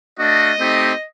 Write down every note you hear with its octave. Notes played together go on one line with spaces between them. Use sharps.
A3 D4 F#4 D#5
A3 C4 D#4 G4